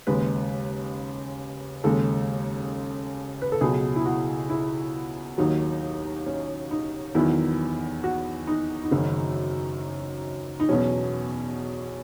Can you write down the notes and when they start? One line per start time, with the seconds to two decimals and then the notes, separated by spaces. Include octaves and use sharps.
0.07 D#2 C#3 G#3 B4
1.84 D#2 C#3 G#3 A4
3.42 B4
3.52 A4
3.61 C#2 B2 F#3 G#4
3.96 E4
4.05 F#4
4.50 E4
5.38 D#2 D#3 F#3 D#4
6.26 C#4
6.71 D#4
7.15 E2 D#3 F#3 E4
8.04 F#4
8.47 D#4
8.84 D#4
8.91 F#1 F#2 D#3 F#3 C#4
10.60 D#4
10.69 E2 B2 F#3 C#4